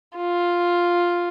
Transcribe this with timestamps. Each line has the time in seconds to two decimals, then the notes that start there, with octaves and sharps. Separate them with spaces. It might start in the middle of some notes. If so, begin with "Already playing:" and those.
0.17 F4